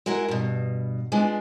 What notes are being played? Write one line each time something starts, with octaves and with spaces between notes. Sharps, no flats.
G#3 E4 F#4 A#4
G2 B2
G#3 B3 D4 F4